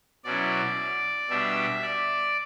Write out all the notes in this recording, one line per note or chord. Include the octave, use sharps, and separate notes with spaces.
B2 F#3 C#4 E4 D5
B2 G3 D4 E5
D5